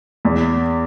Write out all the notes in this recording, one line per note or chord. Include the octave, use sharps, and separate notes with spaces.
E2